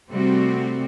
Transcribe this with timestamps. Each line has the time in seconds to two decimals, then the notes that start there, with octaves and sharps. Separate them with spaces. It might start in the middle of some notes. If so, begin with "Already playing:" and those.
0.10 C3 G3 A3 C4 F#4